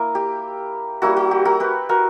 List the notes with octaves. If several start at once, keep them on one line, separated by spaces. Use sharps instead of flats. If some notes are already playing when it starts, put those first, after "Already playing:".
Already playing: A#3 E4 A#4
G4
G3 A#3 E4 F#4
F#4
G4
F#4 A#4
G4 B4
F#4 A#4